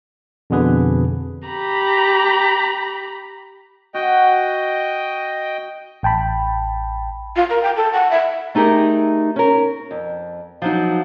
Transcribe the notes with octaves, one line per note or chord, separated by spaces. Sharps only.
F2 B2 D3 G#4 B4
G4 A#5 B5
F#4 D#5 G5
A1 G5 A5 B5
F4
A#4
G5
A4
F#5
E5
A3 D#4 G4 G#4 A#4
C#4 A#4
F2
F3 F#3 D#4